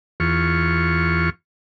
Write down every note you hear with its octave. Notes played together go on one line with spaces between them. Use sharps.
E2 F4 C#6